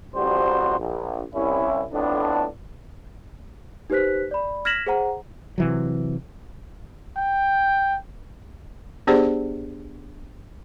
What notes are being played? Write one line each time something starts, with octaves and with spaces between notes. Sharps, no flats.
A1 C3 F3 G3 F#4 C5
A#1
C2 C#4 E4
F2 A2 B3 D4
D#4 G4 B4 C5 F#6 B6
D5 B5
F6 G#6 A#6 B6 E7 F#7
G#4 C5 F#5 A#5
C3 E3 F#3
G5
B3 D4 G4 G#4 C5 D5